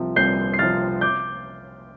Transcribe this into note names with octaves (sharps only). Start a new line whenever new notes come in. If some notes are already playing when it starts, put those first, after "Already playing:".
Already playing: C2 C3 F3
C2 G6 C7
C7
C3 F3 F6 A6
D6 G6